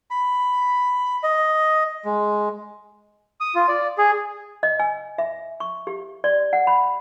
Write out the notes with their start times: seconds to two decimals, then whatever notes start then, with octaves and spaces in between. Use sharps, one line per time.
0.11 B5
1.23 D#5
2.05 G#3
3.41 D#6
3.55 F4
3.68 D5
3.98 G#4
4.63 D#5
4.79 G#5
5.18 E5
5.60 C#6
5.87 G4
6.24 D5
6.53 F#5
6.67 B5